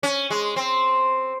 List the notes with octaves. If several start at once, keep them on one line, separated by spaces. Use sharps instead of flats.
C#4
G#3
C4